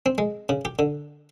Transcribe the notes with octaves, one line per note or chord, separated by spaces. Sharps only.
C4
G#3
C#3
G4
D3